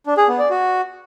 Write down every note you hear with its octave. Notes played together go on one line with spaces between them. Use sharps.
D4
G#4
B3
D5
F#4